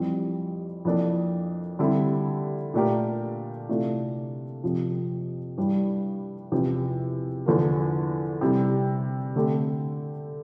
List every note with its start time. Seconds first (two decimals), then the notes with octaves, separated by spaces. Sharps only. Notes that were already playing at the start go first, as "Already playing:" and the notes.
Already playing: F2 E3 G3 C4
0.85 F2 E3 A#3 D4 A4
1.79 D3 G3 C4 E4
2.74 A#2 A3 D4 G4 A#4
3.69 C3 E3 A3 D4 F4
4.63 F2 C3 F3
5.57 G2 E3 G3 D4
6.52 E2 C3 F3
7.46 E2 D3 F3 A#3
8.41 C3 E3 G3
9.36 D3 A3 C4 G4